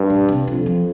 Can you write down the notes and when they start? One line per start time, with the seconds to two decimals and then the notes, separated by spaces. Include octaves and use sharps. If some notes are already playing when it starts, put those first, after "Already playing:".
Already playing: G2
0.10 A#2
0.29 C3
0.47 F2 D3
0.66 F3